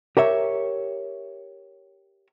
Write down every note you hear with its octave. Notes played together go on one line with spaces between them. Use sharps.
G4 A#4 C#5 E5